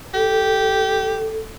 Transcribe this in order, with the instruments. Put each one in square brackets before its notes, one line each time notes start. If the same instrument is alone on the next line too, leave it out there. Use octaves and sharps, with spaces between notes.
[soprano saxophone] G4 [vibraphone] A4